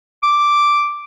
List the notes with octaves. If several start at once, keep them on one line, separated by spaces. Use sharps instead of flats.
D6